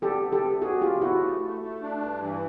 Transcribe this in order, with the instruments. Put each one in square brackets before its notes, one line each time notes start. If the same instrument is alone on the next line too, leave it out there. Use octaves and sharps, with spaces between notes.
[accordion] B3 [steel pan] G4 A4
[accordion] C3
[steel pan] G4 A4
[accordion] B3
[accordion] B3 [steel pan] F#4 G#4
[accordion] C3 [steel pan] F4 G4
[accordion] B3 [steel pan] E4 F#4
[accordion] A3
A3
A3
D4
G2
E3